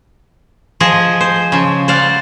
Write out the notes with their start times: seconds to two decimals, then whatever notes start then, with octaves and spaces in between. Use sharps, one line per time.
0.80 F3 G#4 D#5
1.21 C5
1.52 C#3 F3
1.88 C5 D5 F5 F#5